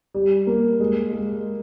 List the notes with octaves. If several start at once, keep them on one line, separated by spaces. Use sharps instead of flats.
G3
A#3
G#3
G#3